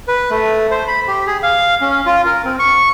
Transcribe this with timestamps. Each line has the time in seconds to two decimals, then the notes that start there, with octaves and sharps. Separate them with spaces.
0.08 B4
0.31 A3
0.71 C5
0.88 B5
1.08 G4
1.27 G#4
1.43 F5
1.81 C#4
2.06 F4
2.26 A#4
2.45 C4
2.59 C#6